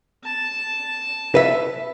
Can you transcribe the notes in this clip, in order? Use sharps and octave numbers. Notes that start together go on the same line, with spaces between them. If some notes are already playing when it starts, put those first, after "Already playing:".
A5
B4 E5